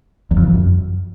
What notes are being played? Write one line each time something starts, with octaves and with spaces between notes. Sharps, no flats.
E2
F2
D#3
F3
F#2